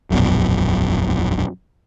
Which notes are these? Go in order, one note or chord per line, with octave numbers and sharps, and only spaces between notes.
E1 A#1 F#2 B2